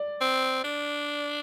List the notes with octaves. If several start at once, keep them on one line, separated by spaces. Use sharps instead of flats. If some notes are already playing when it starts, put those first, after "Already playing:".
Already playing: D5
C4
D4